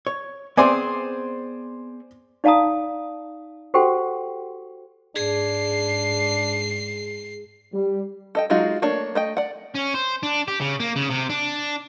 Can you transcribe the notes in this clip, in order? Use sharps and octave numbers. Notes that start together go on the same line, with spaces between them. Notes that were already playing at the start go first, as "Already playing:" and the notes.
C#5
B3 C4 G#4 C5 D5 G#5
D#4 D5 F5 A5 A#5 D#6
F#4 G4 A4 C5 F#5 G5
G#2 D4 G#4 C7
G3
A4 D#5 G5
F#3 G#3 D#4 F4 F#4
A3 A#3 D4 C#5
A3 D#5 G5
D5 F#5
C#4
C5
D4
G4
C#3
A#3
C#3
C3
D4